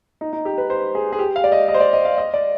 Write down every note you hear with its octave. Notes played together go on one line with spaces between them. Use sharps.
D#4
D#4
G4
B4
C5
G#4
G#4
G4
F5
D5
D#5
D#5
C5
D5
D#5
F5
D#5
D5